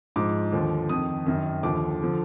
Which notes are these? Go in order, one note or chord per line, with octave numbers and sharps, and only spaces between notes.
G#2 F3 D6
D#2 D3 F3
F2 D#3 D#6
F#2 D#3
D#2 D3 F3 D6
D3 F3